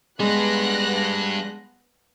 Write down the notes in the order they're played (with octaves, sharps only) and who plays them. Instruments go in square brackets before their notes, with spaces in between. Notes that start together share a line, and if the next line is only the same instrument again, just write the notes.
[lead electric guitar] G3 D4 [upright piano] G#3 [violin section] B3 F#6 A#6